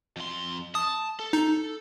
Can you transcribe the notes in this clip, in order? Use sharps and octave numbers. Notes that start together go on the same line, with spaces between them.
F2 C6
A5 D#6
A4
D#4